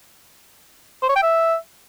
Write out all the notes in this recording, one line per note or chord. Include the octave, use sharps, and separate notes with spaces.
C5
C#5
G5
E5